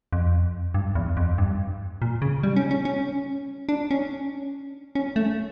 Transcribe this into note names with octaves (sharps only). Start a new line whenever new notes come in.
F2
G2
E2
F2
G2
A#2
C#3
G3
C#4
C#4
C#4
D4
C#4
C#4
A3